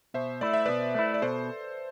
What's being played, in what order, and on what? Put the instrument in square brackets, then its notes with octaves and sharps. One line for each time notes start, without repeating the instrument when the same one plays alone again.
[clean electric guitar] B2 [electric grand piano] C5 E5
[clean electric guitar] A3 E4 [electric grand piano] D5
[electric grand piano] E5
[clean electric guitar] B2 [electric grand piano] B4 D5
[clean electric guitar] A3 E4
[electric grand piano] D5
[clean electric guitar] B2 [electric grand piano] A4 C5